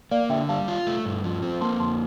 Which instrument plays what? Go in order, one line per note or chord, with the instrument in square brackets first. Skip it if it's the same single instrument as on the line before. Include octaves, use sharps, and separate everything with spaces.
[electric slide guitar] A#3 [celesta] D5 F5
[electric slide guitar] D3 [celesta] E5 G5
[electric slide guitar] G3 [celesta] F5 A5
[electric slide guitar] F4
A3
G2
F3
C4
[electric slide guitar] A#3 [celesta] A5 C6
[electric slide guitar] F2 [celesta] A5 C6